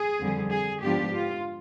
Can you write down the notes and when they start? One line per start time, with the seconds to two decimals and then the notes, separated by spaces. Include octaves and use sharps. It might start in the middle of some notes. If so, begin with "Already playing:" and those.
Already playing: G#4
0.19 F2 D3 G3
0.50 G#4
0.81 G#2 F3 B3 D4 F4 G4
1.12 F4